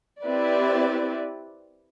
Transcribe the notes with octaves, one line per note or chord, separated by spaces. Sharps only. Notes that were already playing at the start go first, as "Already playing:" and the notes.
C4 E4 G4 B4 D5